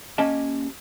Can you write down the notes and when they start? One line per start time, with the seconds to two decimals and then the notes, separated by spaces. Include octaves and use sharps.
0.18 A#3 C#4 G4 D#5 A5